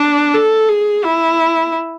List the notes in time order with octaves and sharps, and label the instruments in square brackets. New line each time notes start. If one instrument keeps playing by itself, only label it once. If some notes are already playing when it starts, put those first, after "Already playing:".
Already playing: [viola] D4
A4
G#4
E4